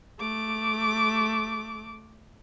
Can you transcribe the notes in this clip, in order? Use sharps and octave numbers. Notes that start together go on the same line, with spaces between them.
A3 D6